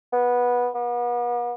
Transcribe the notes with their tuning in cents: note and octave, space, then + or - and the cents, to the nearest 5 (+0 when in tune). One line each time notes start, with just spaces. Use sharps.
B3 -15
B3 -40